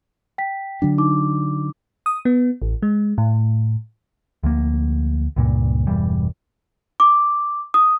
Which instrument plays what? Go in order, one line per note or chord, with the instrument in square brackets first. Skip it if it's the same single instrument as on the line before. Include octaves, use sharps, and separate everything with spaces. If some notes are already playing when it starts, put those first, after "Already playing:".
[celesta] G5 B6
[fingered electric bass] D3 F#3 D4
[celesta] D#4 D6
[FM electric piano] D#6
B3
A1
G#3
A2
[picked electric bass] D2 F3 A#3
C#2 G2 A#2
E1 G2 E3 G3
[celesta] D6
D#6